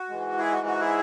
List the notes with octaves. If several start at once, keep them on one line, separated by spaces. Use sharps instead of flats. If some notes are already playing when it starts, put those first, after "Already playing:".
Already playing: F#4
G#2 E3 G#3
E4 G#4
F#4
F#4
E4 G#4